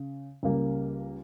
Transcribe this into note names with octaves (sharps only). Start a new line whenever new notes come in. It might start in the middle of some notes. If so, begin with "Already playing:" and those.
Already playing: C#3
C#2 C#3 G3 A#3